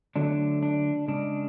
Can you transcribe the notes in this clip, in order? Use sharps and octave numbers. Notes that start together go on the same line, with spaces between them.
D3 F#3 A3 D4
D4
C#3 G#3 D4